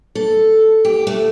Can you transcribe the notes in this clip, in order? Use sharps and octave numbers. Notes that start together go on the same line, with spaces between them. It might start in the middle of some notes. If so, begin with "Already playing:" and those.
A4
G4
A3